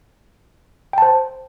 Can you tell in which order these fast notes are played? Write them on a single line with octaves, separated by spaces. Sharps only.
G5 A5 C5